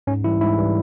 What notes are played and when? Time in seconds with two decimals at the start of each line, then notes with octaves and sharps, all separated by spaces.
0.07 G#2 C#4
0.24 E3 G3 E4
0.41 G#2 E4
0.58 E3 G3